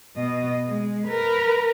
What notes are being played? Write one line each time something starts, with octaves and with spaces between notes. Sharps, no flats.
B2 D#5
G#3
A#4 B4